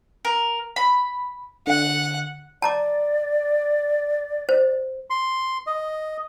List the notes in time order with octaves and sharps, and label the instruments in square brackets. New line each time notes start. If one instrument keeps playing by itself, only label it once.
[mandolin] A#4
B5
[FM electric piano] D3 [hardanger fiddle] F#5
[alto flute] D5 [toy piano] A5 A#5 D6
[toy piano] C5
[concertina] C6
D#5